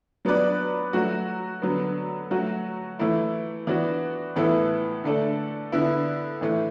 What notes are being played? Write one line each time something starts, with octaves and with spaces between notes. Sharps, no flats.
F#3 B3 D4 B4 D5
F#3 A3 F#4
D3 F#3 B3
F#3 A3 F#4
E3 A3 E4
E3 B3 D4 F#4
A2 E3 B3 E4 A4
D3 A3 D4 A4
D3 B3 E4
A2 E3 A3